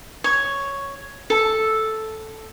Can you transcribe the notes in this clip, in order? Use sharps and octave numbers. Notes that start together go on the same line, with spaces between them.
C#5
A4